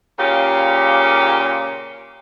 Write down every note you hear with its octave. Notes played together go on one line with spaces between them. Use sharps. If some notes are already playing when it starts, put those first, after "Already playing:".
A#2 C#3 G4